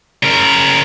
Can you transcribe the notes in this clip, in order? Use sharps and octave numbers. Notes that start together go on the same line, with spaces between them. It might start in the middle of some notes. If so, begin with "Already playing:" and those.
C#3 A#4